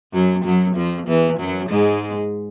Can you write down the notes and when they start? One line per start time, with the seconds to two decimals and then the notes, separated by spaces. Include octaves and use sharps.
0.13 F#2 F#3
0.45 F#2 F#3
0.76 F2 F3
1.07 E2 E3
1.39 F#2 F#3
1.69 G#2 G#3